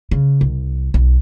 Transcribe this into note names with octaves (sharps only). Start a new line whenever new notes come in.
C#3
C2
B1